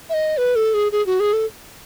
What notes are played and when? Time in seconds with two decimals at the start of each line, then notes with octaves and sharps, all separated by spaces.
0.09 E5
0.14 D#5
0.37 B4
0.56 A4
0.74 G#4
0.92 G#4
1.06 F#4
1.20 G#4
1.33 A4